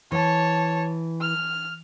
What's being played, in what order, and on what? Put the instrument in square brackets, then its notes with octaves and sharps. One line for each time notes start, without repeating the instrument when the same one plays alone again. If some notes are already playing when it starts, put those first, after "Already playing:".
[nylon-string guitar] E3 [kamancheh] C#5 A5
[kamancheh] F6